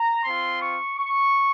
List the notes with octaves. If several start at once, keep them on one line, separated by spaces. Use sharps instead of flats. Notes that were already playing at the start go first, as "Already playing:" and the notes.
Already playing: A#5
C4 F4 C6
C#6
C#6